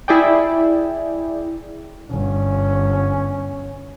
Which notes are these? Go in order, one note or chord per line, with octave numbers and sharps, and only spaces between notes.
E4 G#4 D5 G5
G1 C#4